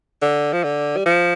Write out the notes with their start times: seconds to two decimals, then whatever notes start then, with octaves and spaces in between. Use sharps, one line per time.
0.22 D3
0.53 F3
0.64 D3
0.97 G3
1.06 F3